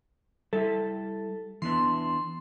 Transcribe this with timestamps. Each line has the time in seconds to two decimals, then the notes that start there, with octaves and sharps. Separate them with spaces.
0.53 G3 E4 A4 E5
1.62 E3 B3 D4 C6